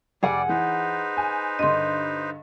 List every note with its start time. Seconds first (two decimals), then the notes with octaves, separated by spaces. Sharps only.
0.23 F1 G3 G#4 D5 F#5
0.49 E3 D#4 B4 C5
1.17 G#5
1.59 G2 D3 D#5 C6